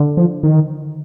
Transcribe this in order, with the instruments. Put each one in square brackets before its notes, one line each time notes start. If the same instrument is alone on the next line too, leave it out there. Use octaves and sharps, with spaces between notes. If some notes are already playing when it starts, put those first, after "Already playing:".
Already playing: [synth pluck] D3
[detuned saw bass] F3
D#3